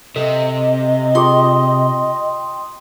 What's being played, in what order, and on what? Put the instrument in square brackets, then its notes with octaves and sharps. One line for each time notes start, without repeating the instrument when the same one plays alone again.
[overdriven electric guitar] C3 [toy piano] A4 [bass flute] D#5
[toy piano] F4 G4 G#4 [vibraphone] G5 C6 D#6